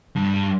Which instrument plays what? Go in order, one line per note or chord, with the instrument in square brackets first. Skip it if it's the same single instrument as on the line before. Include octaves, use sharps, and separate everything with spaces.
[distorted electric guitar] G2